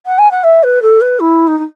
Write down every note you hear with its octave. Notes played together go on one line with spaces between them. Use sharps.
F#5
G#5
F#5
E5
B4
A4
B4
E4
D#4
D#4